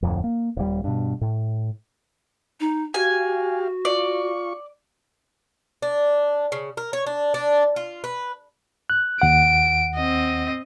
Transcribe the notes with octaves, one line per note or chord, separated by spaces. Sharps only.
D1 F2
A#3
D#1 G3
G2 B2
A2
D#4
F#4 G4 F5 G#5
F4 D5 C#6
D4
C#3
A#4
C#5
D4
D4
F4
B4
F#6
D#2 F#5 D7
C4 D#5